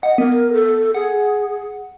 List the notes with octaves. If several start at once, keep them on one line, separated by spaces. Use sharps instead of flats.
D#5 F#5
B3 A#4
A4
G#4 F#5